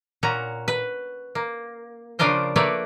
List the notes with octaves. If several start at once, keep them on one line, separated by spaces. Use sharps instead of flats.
A#2 C#4 F#4 A#5
B4
A#3
C#3 F3 D4 F4 A#4 C5
A3 A#3 A#4 B4 C#5 D5